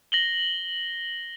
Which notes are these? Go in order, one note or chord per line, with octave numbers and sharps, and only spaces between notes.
A#6 F#7 G7